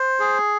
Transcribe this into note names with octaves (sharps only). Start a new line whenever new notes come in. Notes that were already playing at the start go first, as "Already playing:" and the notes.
Already playing: C5
G#4